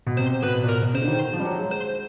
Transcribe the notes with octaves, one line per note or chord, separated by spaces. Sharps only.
B2
C3 C5
B2 B4
A#2
B2 A#4
B2
C#3 C5
D3
D#3
F3
G3
F#3
G#3
C5